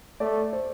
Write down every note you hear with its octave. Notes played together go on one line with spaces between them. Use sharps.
A3 D5
C5